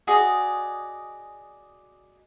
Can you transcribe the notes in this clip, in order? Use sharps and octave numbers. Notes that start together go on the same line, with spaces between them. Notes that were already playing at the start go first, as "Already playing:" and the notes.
F#4 G#4 D5 D#5